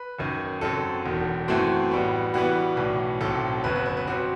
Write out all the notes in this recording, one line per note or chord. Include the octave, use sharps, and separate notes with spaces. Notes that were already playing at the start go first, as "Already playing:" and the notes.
Already playing: B4
F#1 F#2 D#3
F#2 F#3 C4 A4
E1 E2 D#3
F#2 E3 A3 C4 F#4
A1 A2 G3 B3
G2 E3 G3 B3 F#4
B1 A2 E3
B1 A2 F#3 C4 A4
G1 F#2 F#3 B3 B4
B4
B4
B4
G2 F#3 C4 F#4